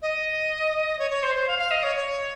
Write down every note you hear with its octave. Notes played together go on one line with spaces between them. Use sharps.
D#5
C#5
C#5
C5
C5
F5
F5
D#5
C#5
C#5